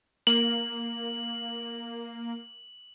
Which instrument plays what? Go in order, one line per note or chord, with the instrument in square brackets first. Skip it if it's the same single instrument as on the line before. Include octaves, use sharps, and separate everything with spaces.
[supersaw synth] A#3 [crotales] F#7